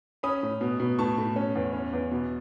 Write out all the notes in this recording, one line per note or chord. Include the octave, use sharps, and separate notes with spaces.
C#4 B5 D#6
A2
B2
B2
A2 A5 C#6
A2
C#4
E2
C#4
E2
B2